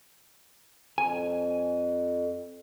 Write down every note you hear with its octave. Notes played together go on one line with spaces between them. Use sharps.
F2 G#5